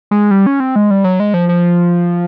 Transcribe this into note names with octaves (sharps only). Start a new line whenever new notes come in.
G#3
G3
C#4
C4
G#3
G3
F#3
G#3
F3
F3